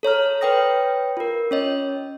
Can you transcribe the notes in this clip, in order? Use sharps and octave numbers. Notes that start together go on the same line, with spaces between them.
A4 C#5 A#5 F6
B4 C#5 G5 D#6 A#6
F4 A#4
C#4 C#5 D#5